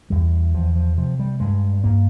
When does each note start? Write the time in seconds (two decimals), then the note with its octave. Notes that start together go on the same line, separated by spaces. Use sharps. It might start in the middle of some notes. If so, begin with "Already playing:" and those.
0.10 E2 G3
0.54 E2 F3
0.75 F3
0.98 C3 F3
1.19 G3
1.40 G2 G#3
1.84 G2 A#3